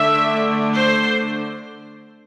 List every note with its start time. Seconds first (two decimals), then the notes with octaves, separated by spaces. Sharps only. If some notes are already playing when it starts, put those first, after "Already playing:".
Already playing: D3 A3 D4 E5
0.73 C5